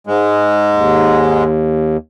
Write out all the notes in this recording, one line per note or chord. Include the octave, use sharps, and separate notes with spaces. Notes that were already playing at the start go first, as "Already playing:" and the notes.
G#2 G#3
D#2